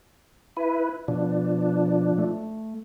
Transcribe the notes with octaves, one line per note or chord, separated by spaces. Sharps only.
E4 B4
B2 F3 D4
A3